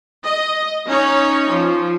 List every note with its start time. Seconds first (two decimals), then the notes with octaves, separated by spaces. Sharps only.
0.24 D#5
0.87 C#4 D#4 C#5
1.50 F3